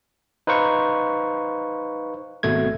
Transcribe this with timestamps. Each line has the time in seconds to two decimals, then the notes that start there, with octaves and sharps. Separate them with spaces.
0.47 D#4 B4 C5 F5 C#6
2.43 G#1 B2 A3 G#6